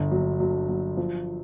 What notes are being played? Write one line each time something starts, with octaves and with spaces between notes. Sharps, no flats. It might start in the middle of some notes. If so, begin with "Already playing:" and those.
Already playing: G1 D3
F#3
F#3
F#3
F3